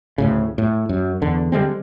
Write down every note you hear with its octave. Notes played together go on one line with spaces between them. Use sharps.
D2 A2 C#3
A2
F#2
E2 D3
D3 G3 G#3 C4